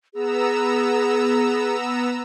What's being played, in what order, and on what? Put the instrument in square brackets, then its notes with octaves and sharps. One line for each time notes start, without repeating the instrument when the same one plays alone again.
[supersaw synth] B3 A#5 E6 [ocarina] G#4